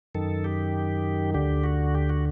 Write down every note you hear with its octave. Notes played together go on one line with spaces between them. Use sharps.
F#2 D#3 A4
G4
D2 D3 G4
F#4
G4
F#4